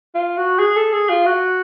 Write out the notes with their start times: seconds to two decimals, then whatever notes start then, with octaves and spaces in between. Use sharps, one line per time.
0.14 F4
0.37 F#4
0.59 G#4
0.76 A4
0.93 G#4
1.09 F4
1.26 F#4